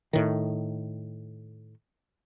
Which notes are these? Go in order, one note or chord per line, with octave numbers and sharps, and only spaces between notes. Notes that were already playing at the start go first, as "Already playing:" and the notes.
A2 D#3